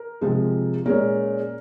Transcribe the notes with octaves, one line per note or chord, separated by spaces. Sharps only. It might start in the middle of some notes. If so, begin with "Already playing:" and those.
Already playing: A#4
C3 F3 G#3
A#2 G#3 C#4 A#4